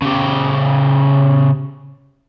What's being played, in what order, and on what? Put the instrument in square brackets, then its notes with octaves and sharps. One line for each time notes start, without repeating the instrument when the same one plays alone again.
[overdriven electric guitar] C#3 G4